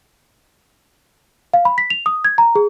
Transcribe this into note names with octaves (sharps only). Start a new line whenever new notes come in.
F5
B5
B6
F7
D#6
G#6
A#5
G#4